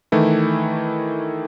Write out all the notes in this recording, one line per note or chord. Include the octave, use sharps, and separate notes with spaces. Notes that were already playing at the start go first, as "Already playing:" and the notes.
D#3 E3 A3 E4